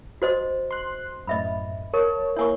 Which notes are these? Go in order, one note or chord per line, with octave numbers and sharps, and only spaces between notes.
F#4 C5 D#5
C6 F#6
F#2 A2 D#5 E5 B5
A#4 C#5 A5
A#3 E4 C#5 G#5 C#6